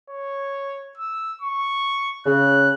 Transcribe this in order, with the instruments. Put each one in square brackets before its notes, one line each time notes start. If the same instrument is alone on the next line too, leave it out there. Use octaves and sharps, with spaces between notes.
[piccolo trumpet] C#5
E6
C#6
[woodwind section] C#3 [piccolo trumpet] F#6